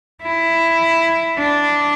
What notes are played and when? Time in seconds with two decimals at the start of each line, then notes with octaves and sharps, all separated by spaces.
0.22 E4
1.38 D4